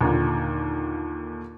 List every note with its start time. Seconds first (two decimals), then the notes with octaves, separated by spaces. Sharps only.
0.01 D#2 A#2 D3